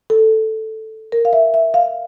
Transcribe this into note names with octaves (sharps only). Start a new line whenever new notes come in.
A4
A#4
F5
E5
E5
F5